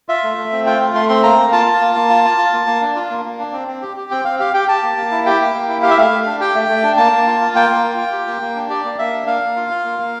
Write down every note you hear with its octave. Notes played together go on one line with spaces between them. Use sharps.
F4 E5
A3
A3
C4
F4 G5
A3
A3 C6
C4 C6
A#3 A#5
A#3
F4 A5
F4
A#3
A#3
F4
F4
F4
A#3
A#3
D4
F4
A#3
A#3
D4
C4
C4
G4
G4
C4 G5
C4 F5
G4 F5
G4 G5
G4 A5
A#3
A#3
E4
G4 G5
A#3
A#3
E4
G4 F5
E5
A3 F5
A3
D4
G4 G5
A3
A3
D4
A#3 A5
A#3
F4
F4
A#3 G5
A#3
F4
F4
G4
A#3
A#3
D4
G4 D5
A#3
A#3 E5
D4
A#3 F5
A#3
F4
F4
A#3
A#3